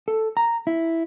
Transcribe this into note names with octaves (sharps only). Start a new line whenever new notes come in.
A4
A#5
E4